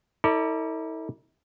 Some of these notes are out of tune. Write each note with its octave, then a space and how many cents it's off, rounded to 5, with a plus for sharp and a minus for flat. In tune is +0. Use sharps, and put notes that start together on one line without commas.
E4 -40 A4 +40 D5 +0